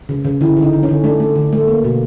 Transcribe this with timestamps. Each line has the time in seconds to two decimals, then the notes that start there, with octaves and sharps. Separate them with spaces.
0.09 C#3
0.25 C#3
0.41 D3 E4
0.57 D3
0.62 D#4
0.73 D3
0.83 C#4
0.89 D3
1.04 A3 D4
1.20 A3
1.36 D3
1.53 A3
1.68 A#3
1.84 B2